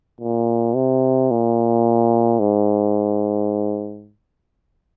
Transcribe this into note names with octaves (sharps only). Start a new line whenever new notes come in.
A#2
C3
A#2
G#2